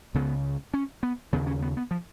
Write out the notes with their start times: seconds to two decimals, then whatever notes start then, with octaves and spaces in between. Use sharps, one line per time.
0.15 C#2 C#3 B3
0.74 C#4
1.03 B3
1.33 D#2 C#3 B3
1.47 C#4
1.62 B3
1.77 B3
1.91 F3